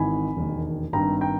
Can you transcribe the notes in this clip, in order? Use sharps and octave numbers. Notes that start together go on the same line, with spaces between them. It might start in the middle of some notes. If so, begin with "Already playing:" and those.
Already playing: G#1 G#2 E3 G#5 B5
E1 D#2 D#3
G#1 G2 D#3 G5 A#5
G5 A#5